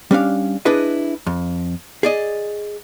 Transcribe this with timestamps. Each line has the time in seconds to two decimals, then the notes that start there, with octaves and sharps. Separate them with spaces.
0.11 G3 C#4 D4 F5
0.65 D4 E4 G#4 B4 D#5
1.26 F2
2.03 G#4 D5 D#5